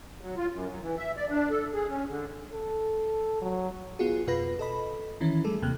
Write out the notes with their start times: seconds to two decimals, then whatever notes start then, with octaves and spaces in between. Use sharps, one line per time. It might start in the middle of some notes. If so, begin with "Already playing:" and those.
0.21 F#3
0.37 F4
0.52 F#2
0.68 F#3
0.81 E3
0.97 E5
1.16 D5
1.29 D4
1.50 A4
1.73 G#4
1.88 C#4
2.07 D3
2.52 A4
3.41 F#3
3.99 B3 F4 F#4 G#4
4.27 F2 B2 F4 B4 B5 A#6
4.59 A4 D#5 B5
5.20 D#3 E3 C#4 E4
5.44 G3 A3 G#4 A4
5.62 D#2 C3 A#3 F#6